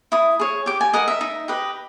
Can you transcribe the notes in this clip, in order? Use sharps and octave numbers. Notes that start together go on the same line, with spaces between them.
E4 D#6
G#4 C#5
G4 D6
G#5
A#4 D#5 F#5
E5
D#4
G4 B4 D#5